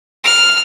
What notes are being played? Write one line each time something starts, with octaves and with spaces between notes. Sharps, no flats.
F6